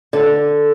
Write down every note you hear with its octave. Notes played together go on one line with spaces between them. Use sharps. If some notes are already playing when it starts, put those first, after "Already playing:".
D3